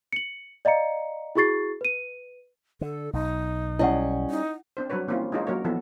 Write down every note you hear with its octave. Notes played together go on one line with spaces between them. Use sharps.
C#7 F#7
D5 D#5 F5 A#5 C#7
E4 F#4 G#4 C#6 A6 C7
B4 D#7
D3 A4
B1 D#4
G3 C#4 E4 D#5 F#5
D#4
C4 D4 C5
F#3 G3 D4 B4 C#5
E3 A#3 C4 C#4 E4 F4
G#3 D4 D#4 F4 G4 C#5
F#3 A#3 A#4 C#5
E3 F3 B3 A4